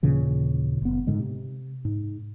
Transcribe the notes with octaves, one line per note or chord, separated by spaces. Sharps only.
D#2 A#2 C#3 E3
F#1 B3
G#2 D3 G#3
C3
G#2